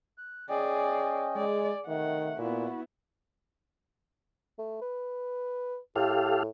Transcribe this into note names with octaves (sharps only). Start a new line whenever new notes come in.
F#6
C#4 G#4 D5 D#5 G5
G#3 G#4 D5
C3 D#3 A3 F#5
A#2 B3 E4 F#4
A3
B4
A2 G4 A4 F5